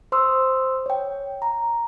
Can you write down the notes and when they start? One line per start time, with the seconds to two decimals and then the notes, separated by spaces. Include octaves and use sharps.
0.12 C5 C6 D#6 E6
0.86 C#5 G5
1.42 A#5